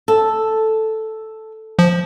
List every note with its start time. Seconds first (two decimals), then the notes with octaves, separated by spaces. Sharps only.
0.08 A4
1.79 F3